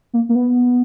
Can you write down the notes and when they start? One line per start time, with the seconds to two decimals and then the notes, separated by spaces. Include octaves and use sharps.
0.13 A#3
0.29 A#3
0.35 B3